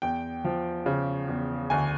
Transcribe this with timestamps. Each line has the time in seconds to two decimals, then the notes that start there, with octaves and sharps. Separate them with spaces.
0.02 E2 G5
0.44 F3
0.86 C#3
1.28 E2
1.70 D2 G#5